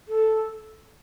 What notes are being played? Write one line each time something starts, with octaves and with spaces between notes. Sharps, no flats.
A4